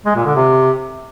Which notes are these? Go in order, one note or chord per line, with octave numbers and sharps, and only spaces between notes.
G#3
A#2
D3
C3